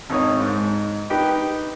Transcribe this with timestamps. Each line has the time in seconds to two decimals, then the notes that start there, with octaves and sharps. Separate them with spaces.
0.10 G#1 D#4 C#5 D#6
0.40 G#2
1.10 D#4 G4 B4 D#5 G5